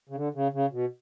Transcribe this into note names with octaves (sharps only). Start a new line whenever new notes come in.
C#3
D3
C#3
C#3
B2